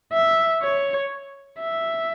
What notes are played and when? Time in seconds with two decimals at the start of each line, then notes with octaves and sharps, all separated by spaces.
0.13 E5
0.63 C#5
1.61 E5